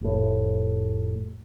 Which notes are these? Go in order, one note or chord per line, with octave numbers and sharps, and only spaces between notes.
F1 A2